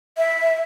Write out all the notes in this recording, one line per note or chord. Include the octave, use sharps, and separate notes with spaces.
E5